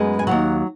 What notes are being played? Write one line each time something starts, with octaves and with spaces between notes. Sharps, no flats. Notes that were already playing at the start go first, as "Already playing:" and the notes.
Already playing: F#2 G#3 B3
G#5
D#2 C#3 F#3 F#5